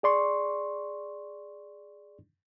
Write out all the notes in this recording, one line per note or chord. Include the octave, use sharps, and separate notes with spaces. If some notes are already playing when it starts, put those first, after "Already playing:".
G#4 D5 C6 C#6